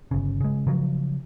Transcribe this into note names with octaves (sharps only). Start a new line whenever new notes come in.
G1 C#3
C#3 G#3
C#3 F3 F#3